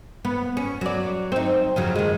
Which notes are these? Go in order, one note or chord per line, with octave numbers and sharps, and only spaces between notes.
B3
C#4
F#3 D5
C4 D#4
F2 C#3 F#3
D#3 G#3